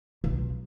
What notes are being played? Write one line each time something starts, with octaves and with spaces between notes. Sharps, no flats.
B1